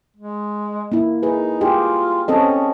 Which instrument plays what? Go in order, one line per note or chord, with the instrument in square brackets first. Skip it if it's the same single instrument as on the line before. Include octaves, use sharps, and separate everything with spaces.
[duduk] G#3
[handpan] A#3 E4
[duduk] D#4 [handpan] G#4 B4
[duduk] F4 [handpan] G4 G#4
[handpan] C4 A4 D#5 [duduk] C#4